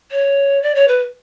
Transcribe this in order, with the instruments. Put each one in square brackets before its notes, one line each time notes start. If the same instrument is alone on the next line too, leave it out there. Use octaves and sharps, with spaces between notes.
[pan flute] C#5
D5
C#5
B4